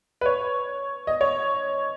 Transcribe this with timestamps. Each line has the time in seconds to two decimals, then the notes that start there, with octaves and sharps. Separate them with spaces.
0.21 B4
0.26 C#5
1.07 D#5
1.21 C#5